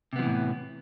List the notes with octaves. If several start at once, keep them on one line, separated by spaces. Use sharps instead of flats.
A2 C3 E3 F3 B3